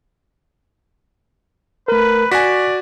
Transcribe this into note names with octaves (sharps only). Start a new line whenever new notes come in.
A3 A#4 B4
F#4 D5 G#5 F#6 B6